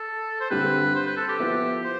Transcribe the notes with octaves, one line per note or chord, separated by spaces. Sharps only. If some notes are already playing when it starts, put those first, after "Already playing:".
Already playing: A4
C5
G2 D3 G3 C4 B4
C5
B4
A4
G4
F3 B3 E4 B4
C5